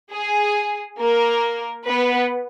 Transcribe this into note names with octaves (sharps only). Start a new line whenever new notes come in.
G#4
A#3 A#4
B3 B4